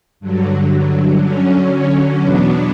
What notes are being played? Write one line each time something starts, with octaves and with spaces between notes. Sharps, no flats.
G2 D3 F#3
D3 F#3 C#4
E2 B2 F#3 B3 D4